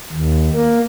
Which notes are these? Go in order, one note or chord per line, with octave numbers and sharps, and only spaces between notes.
D#2
A#3